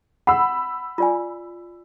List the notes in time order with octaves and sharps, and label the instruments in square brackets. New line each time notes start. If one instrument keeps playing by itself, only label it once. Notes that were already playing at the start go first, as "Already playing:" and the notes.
[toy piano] F#5 [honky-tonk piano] B5 E6
[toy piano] F4 D5 G#5